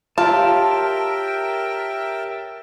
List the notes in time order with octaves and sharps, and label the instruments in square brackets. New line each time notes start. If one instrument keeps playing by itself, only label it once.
[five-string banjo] F4 [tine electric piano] G4 C#5 [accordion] A#4 E5 G5 [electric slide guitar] A5